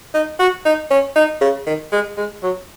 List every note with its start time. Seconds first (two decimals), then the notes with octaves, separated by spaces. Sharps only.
0.14 D#4
0.39 F#4
0.65 D#4
0.91 C#4
1.16 D#4
1.41 C#3
1.66 D#3
1.92 G#3
2.17 G#3
2.43 F#3